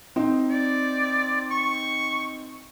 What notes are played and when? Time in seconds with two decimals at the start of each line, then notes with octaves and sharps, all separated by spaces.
0.16 C4 D#4
0.50 D5
1.51 C#6